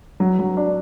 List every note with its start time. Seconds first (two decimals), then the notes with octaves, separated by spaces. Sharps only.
0.20 F#3
0.39 F#3
0.57 D4